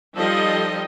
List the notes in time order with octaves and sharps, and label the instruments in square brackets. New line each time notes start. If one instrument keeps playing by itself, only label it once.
[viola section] F3 G3 D#4 A4 D#5 G5